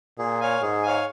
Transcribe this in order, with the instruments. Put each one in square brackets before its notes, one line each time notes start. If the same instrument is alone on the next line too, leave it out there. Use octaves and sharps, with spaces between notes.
[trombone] A#2 [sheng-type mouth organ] G#4
[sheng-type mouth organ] C#5 F5 G#5
[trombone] G#2 [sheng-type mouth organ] G#4
[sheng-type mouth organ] C#5 F5 G#5